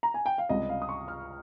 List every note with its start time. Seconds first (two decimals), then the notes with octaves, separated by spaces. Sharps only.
0.03 A#5
0.14 G#5
0.26 G5
0.38 F5
0.49 C#2 C3 G3 D#5
0.69 F5
0.82 D#6
0.89 C#6
1.08 F6